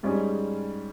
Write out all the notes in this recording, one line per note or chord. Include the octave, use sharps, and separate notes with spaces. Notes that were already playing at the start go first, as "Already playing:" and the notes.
G#2 G3 C#4 G#4